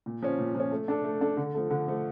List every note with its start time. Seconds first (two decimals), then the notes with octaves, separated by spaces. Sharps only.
0.06 A#2
0.22 F3 C#4
0.39 A#2
0.55 F3 C#4
0.71 A3
0.88 D4 A4
1.04 A3
1.21 D4 A4
1.37 D3
1.55 F3 A3
1.70 D3
1.87 F3 A3